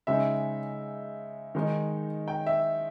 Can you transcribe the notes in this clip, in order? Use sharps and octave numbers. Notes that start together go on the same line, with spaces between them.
C#3 G#3 D#4 E5
D#3 G#3 D#4
G5
E5